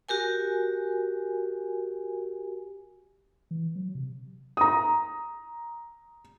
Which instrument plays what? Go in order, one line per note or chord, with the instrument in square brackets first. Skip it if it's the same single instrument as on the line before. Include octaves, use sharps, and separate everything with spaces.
[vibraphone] F#4 G4 A#4 G#5
[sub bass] E3
F#3
C3
[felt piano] A#5 D#6